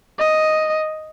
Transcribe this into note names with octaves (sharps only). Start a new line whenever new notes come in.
D#5